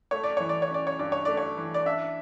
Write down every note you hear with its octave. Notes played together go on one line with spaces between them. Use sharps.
A3 C#5
D5
E3 C#5
D5
C#5
C#4 D5
C#5
G2 D5
C#5
A3 D5
C#5
E3
D5
D4 E5